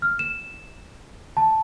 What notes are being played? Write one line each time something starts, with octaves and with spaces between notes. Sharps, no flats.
F6
E7
A5